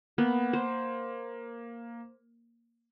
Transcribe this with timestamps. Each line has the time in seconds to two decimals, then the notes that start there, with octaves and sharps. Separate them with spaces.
0.18 A#3 B3 B4
0.53 C5